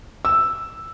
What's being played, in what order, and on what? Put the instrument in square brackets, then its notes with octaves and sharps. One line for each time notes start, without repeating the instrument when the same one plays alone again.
[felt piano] E6